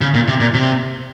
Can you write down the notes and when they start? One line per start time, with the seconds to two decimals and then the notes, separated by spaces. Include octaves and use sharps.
0.01 C#3
0.14 A#2
0.28 C3
0.40 A#2
0.54 C3